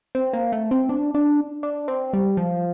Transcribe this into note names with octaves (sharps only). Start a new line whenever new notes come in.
C4
A#3
A3
C4
D4
D4
D4
C4
G3
F3